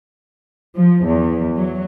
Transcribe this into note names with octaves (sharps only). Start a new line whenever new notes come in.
F3
E2
F#3